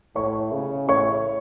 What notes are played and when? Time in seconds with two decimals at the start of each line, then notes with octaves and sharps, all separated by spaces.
0.16 A2 C#5 C#6
0.52 C#3
0.89 A2 C#5 C#6